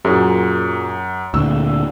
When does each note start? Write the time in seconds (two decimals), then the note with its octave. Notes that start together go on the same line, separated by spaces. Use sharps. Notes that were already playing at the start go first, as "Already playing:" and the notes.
0.05 F#2 A#2 F#3 G#4
1.34 D2 A#2 D3 E6